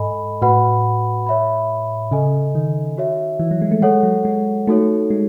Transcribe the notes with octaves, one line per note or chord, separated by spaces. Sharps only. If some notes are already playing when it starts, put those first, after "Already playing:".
Already playing: G#2 A4 D#5 G#5 B5
A2 F#4 B4 F#5 B5
C#5 E5 B5
C#3 A4 D#5 G#5
D#3
F#4 C#5 E5
E3
F#3
G#3
A3
G#3 A4 C#5 F#5
F#3
G#3
A3 D#4 F#4 A4 C#5
G#3